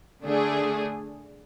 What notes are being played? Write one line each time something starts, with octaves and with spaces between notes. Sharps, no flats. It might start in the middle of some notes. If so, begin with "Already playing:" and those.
D3 A3 D4 G#4